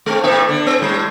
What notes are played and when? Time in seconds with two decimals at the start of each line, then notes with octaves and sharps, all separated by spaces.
0.06 G#3 C4
0.23 A2 A#3 E5
0.49 D3
0.66 B3
0.78 A2 G3